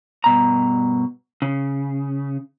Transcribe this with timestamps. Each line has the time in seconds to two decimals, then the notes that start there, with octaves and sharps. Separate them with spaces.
0.24 G2 B2 A#5
1.42 C#3